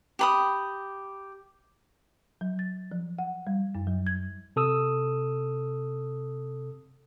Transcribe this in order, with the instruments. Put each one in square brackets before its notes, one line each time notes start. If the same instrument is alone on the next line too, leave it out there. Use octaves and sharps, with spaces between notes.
[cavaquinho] G4 B5 D#6
[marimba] F#3
A6
F3
F#5
G3
F#2
F#3
G#6
[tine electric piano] C3 A4 D#6 E6